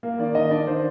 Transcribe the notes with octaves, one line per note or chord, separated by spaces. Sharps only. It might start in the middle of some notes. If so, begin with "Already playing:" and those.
A#3
D#3 D5
D#3 D#5
D4 D5
D#3 C5